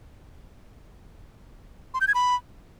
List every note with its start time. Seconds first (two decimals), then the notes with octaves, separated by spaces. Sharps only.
1.94 C6
2.01 G6
2.08 G#6
2.14 B5